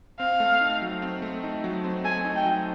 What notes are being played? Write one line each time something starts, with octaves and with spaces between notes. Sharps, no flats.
C4 F5
A3
D#4
F#3
C4
A3
D#4
F#3
C4
A3 G#5
D#4
G5
F#3